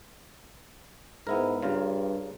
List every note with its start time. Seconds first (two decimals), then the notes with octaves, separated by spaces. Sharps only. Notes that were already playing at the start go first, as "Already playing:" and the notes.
1.27 G#2 B3 E4 A#4
1.62 G2 C#3 F4 A#4